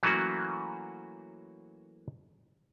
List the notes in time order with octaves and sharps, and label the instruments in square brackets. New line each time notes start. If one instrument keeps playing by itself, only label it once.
[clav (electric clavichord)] E3 F#3 A3 A#3 C#4 F#4